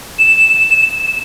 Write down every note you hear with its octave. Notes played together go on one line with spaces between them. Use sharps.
E7